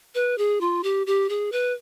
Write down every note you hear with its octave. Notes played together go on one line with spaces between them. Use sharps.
B4
G#4
F4
G4
G4
G#4
B4